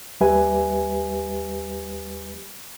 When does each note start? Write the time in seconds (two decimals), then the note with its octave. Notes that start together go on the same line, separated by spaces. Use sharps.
0.21 D#2 G3 G4 B4 E5 G#5